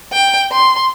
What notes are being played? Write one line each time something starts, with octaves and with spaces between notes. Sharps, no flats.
G5
C6